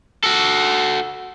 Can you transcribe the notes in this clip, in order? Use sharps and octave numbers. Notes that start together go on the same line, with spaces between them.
F#4 A4